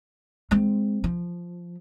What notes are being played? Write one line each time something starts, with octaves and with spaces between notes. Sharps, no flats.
G#3 C4
F3